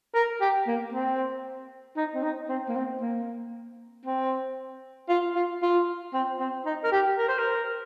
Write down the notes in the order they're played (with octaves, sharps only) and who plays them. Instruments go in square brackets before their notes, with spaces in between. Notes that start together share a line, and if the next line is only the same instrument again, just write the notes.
[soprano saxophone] A#4
G4
A#3
C4
D#4
C4
D#4
C4
A#3
C4
A#3
C4
F4
F4
F4
C4
C4
D#4
A#4
G4
A#4
C5
A#4